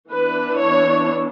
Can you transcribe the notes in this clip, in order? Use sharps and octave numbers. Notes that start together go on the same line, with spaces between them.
E3 B3 D4 B4
C#5